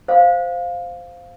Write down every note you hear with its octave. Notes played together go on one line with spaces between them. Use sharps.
C5 F5